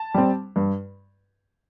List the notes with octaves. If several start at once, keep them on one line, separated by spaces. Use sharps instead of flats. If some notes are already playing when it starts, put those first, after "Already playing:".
Already playing: A5
G3 C4
G2